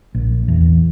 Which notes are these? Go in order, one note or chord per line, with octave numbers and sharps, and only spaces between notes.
A#1
E2